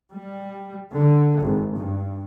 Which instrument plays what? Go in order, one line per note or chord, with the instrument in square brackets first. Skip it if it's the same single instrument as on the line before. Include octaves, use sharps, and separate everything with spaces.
[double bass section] G3
D3
G#1
G2